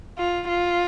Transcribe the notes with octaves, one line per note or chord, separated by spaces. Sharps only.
F4
F4